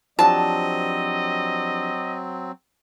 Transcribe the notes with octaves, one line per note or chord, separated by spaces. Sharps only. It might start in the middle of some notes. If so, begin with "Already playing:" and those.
F3 F#3 C4 D4 G4 D#5 A5